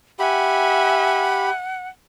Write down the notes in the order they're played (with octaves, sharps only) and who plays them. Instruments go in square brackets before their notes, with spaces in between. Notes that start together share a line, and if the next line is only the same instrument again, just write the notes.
[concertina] G4 B5 [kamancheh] E5 G#5 [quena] F#5